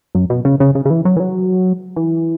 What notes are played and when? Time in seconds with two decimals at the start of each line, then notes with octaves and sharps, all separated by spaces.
0.15 F#2
0.30 B2
0.45 C#3
0.60 C#3
0.75 C#3
0.85 C#3
0.90 E3
1.05 F#3
1.17 E3
1.20 F#3
1.96 E3